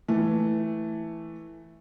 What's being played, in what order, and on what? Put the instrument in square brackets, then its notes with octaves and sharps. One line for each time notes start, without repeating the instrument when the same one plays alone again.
[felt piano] E3 A3